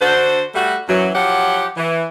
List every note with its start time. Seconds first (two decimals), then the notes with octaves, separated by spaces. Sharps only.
0.01 D3 D4 F#4 C5
0.55 G3 A3 F#4
0.88 F#2 E3 F#3
1.15 F3 F#3 G4 F#5
1.77 E3